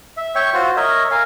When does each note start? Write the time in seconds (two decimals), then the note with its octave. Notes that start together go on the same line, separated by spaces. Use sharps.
0.17 E5
0.35 C#5 E5 G5 C#6
0.54 F4 F#4 C5
0.77 A#4 C#5 D#5 E5
1.11 A#4 F5 G#5